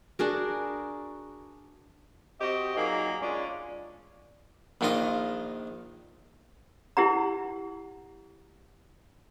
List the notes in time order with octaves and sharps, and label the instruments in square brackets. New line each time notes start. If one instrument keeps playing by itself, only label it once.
[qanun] D4 F#4 G#4 A#4
[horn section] C4 F#4 G4 D#5
A#2 F#3 A#3 D#4 G#4
G#3 C#4 D4 F4 D5
[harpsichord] A#1 D#3 D4 F4 D#5
[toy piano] E4 G4 F#5 A#5